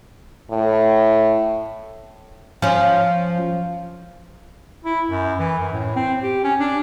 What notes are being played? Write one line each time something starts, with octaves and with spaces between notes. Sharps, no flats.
A2
F3 C#4
E4
F#2
E3
F#2
A2
C4
G4
C#4
D4